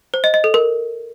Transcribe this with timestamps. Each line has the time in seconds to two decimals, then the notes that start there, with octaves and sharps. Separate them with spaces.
0.14 C5
0.24 D#5
0.34 D#5
0.44 A4
0.54 A#4